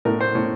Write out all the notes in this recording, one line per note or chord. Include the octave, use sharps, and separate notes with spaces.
A2 A#4
C5
A2 C#5